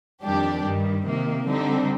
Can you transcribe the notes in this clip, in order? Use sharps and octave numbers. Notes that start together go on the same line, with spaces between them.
F2 D#3 G3 D4 G4
G2 D#3 G3
C3 D#3 A#3
D3 G3 C4 D#4